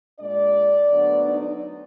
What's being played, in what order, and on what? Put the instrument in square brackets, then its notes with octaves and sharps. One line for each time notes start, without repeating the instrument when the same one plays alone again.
[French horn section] A#2 G#3 D4 D5
D2 D3 F#3 B3 D4
D#4